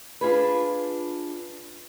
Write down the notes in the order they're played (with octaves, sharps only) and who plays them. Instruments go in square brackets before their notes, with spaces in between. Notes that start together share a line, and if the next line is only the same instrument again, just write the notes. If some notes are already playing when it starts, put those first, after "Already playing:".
[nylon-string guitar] D4 F4 G#4 B4